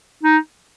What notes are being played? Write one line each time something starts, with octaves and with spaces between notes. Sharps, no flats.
D#4